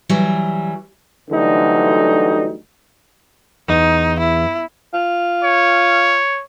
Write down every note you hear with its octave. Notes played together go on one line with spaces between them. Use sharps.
E3 F#3 G3
D2 D3 E3 F#3 G3 D#4
E2 D#4
E4
F4
C#5